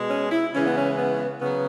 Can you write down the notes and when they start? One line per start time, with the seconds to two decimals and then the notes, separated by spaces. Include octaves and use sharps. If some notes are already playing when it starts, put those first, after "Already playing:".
Already playing: B2 G#3
0.09 C#4
0.31 E4
0.53 C#3 E3 G#3 C#4
0.65 B3
0.78 C#4
0.97 B3
1.40 C#3 F#3 B3